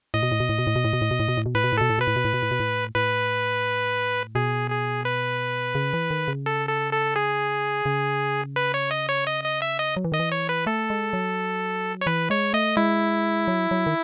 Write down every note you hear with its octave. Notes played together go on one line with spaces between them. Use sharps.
A2 D#5
B2
A2
B2
A2
B2
A2
B2
A2
B2
A2
B2
A2
B2
A2
B2
A2 B4
B2
A2
B2 A4
A2
B2 B4
A2
B2
A2
B2
A2
B2
A2
A2 B4
B2 G#4
G#4
B4
C#3
E3
D#3
C#3
A4
A4
A4
G#4
C#3
B4
C#5
D#5
C#5
D#5
D#5
E5
D#5
F#3
E3
D#3 D#5
E3
C#5
B4
A3 A4
G#3
F#3
C#5
E3 B4
G#3 C#5
A3 D#5
G#3 E4
F#3
F#3
D#3